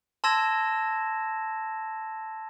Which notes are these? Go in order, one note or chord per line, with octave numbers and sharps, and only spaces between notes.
A5 C6 E6 G#6 A#6 E7